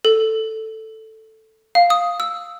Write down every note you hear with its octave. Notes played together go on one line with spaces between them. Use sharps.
A4
F5
D#6
E6